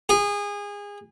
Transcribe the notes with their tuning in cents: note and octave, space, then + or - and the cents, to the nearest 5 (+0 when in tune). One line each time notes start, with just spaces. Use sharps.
G#4 -25